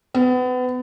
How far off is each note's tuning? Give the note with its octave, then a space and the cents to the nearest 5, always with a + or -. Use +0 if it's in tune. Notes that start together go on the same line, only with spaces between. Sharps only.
B3 +30